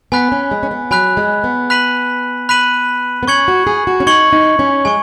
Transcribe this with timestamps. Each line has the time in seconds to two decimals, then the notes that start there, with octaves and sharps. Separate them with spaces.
0.12 B3 G#5 B5 F#6 B6
0.32 C#4
0.51 G#3
0.63 C#4
0.71 B3
0.91 F#3 G#5 B5 F#6 B6
1.17 G#3
1.44 B3
1.70 B5 F#6 B6 D#7 F#7
2.49 B5 F#6 B6 D#7 F#7
3.23 B3
3.28 C#4 C#6 G#6 C#7 F#7
3.48 F#4
3.67 G#4
3.87 F#4
4.00 C#4
4.07 D#4 C#6 G#6 C#7 F#7
4.33 D#4
4.59 C#4
4.85 G#3 G#5 C#6